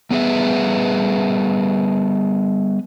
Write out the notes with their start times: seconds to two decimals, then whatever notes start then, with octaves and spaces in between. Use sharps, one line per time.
0.11 G3 B3 G#4 B4 E5